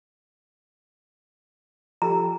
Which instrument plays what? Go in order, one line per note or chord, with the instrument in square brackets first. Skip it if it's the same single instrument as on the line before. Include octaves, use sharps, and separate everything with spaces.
[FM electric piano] F3 G4 A4 [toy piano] A#5